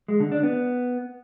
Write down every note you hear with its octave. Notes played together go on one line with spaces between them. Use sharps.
G#3
D3
D4
B3